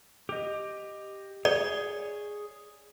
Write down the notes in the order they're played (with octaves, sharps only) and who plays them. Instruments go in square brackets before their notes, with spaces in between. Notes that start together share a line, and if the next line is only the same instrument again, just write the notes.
[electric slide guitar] G4 D#5
[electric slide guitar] G#4 C#5 [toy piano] D5